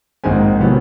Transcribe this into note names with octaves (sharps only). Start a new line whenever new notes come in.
A#1 G#2 D#3 G#3 C4 G#5
C3 D#3 F#3 B3